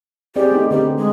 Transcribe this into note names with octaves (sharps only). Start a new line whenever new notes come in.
C4 G4 G#4 D5
A3 B3 D#4
D3 B3 C4 G4
G#3